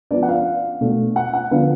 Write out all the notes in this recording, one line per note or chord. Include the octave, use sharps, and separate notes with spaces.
F3 B3 D4 D5
F#5
F5
B2 A3 D4
F#5
F#5
D3 F3 B3 D4 F5